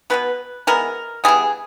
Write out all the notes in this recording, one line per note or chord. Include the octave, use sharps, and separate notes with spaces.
B2 G#3 B3 B4
E3 G#3 B3 A#4
E3 G3 B3 G#4